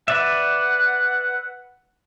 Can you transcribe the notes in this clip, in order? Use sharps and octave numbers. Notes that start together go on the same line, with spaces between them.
B4 D5 E5 F#5